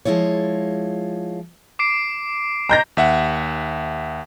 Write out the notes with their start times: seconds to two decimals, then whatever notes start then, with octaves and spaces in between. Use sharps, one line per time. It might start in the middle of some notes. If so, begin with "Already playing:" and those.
0.05 F3 G#3 E4 F4 C#5
1.79 D6 C7 D7
2.69 A#5 G6 A#6
2.97 D#2 E5 F#5